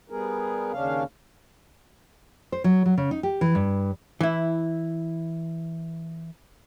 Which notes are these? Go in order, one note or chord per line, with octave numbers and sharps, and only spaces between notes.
G3 B3 G#4 A#4
D#2 C#3 C#4 D4 F5
C5
F#3
F#3
C#3
D#4
G4
E3
G2
E3 E4